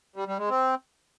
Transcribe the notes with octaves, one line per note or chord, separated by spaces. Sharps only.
G3
G3
G#3
C4